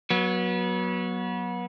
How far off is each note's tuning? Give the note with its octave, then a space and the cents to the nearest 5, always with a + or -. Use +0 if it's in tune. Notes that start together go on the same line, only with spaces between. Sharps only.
F#3 +0 B3 -30